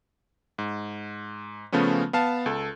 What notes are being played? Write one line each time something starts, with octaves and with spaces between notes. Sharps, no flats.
G#2
C#3 F3 A3 B3 C#4
B3 F5 A5
C#2 A4